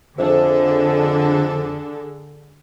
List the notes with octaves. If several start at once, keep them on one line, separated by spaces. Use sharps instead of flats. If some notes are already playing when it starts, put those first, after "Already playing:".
F2 D3 F3 D4 G#4 A4 C5 E5